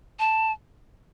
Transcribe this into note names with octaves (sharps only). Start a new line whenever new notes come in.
A5